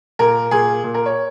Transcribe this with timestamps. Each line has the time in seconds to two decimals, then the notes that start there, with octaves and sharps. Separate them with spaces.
0.19 A#2 A#4
0.51 A#2 G#4
0.84 A#2
0.94 A#4
1.06 C#5